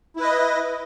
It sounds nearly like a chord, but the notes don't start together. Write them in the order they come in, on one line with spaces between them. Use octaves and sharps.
E4 B4 D#5